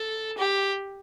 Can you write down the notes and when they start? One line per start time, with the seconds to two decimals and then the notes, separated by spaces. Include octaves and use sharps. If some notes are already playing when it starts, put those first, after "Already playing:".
Already playing: A4
0.37 G4